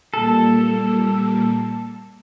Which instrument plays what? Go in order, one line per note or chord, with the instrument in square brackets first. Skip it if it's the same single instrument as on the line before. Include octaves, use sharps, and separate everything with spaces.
[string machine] A#2 G3 A#3 [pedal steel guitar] A4